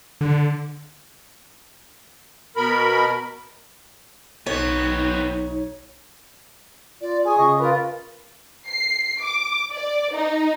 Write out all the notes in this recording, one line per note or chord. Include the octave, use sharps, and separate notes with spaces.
D3
B2 A#4 B5
B1 B3 C4 D#4 C#5
F4 D5
G#4 G#5 C#6 D#6
C#3 D#5
F4 A#4 B4
C7
D6
D5
D#4